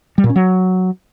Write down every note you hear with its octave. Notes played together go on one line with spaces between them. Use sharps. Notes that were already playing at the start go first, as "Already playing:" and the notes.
G3
A#2
C#4
F#3